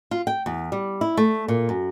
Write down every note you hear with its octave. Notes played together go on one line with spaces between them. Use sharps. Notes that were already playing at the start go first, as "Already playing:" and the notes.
F4
G5
E2
G3
E4
A3
A#2
F#2